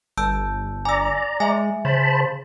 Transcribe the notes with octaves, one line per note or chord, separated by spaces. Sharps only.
G1 A5 E6 G6
D5 G#5 A#5 E6
G#3 E5 G#5
C#3 C5 A5 B5